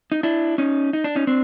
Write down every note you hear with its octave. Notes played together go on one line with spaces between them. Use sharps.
D#4
D4 E4
C#4 D#4
D#4
D4
C#4 D#4
C4 D4